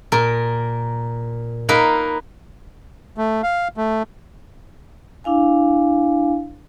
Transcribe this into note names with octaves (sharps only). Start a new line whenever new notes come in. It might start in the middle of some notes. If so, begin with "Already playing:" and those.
A#2 A#4
A#3 D#4 A#4 B4
A3
F5
A3
D4 E4 F5 G#5